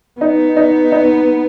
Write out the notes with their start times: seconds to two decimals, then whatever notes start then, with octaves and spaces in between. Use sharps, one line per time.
0.21 B3 D#4
0.57 D#4
0.92 D#4